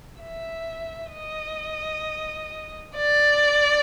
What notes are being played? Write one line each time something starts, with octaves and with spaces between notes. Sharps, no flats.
E5
D#5
D5